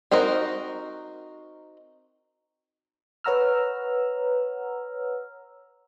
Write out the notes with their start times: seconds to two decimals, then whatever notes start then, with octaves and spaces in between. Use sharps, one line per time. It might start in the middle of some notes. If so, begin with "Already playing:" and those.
0.11 C4 D#4 F#4 A#4 D#5
3.24 B4 C#5 F#5 A#5 E6 F6